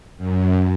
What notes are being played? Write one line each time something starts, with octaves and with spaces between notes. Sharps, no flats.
F#2